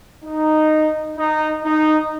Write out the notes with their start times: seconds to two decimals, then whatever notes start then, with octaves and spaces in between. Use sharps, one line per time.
0.24 D#4
1.18 D#4
1.65 D#4